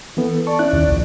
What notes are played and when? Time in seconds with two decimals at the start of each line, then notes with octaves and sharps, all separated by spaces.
0.17 E3 B3 A4
0.47 D5 A5 C#6
0.59 C#4 E4 F#6
0.73 D#2
0.88 A#1